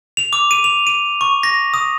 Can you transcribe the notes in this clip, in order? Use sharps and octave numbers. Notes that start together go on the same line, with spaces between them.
F7
D6
D#7
F7
D#7
C#6
A#6
D#6